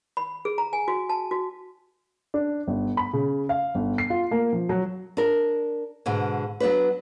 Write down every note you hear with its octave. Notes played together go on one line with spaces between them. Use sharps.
B5
G#4
A#5
G#5
F#4
A5
F#4
D4
G1
B5
C#3
F5
G1
C7
F4
A#3
F3
F#3
D4 A#4
G#2 B2 D3
F#3 B3 D4 B4